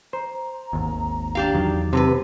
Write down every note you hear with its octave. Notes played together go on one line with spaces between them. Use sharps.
C5 A#5
G#1 D#2
D4 G4 F5
E2 D#3 F#3
F#2 C3 F4 B4 A5